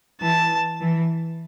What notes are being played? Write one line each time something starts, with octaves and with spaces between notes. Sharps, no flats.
E3 A5
E3